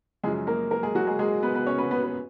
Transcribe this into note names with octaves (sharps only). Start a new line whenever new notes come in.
F#2 C#3 F3 G#3 G#4
A#3 A#4
A#3 A#4
G#3 G#4
F#3 F#4
G#3 G#4
G#3 G#4
B3 B4
B3 B4
C#4 C#5
B3 B4
B3 B4
B3 B4